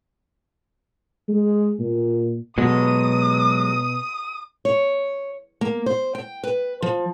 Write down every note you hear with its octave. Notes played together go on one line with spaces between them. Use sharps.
G#3
A#2
B2 F#3 G#3 A4 D#6
C#5
A#3
C5
G5
B4
F3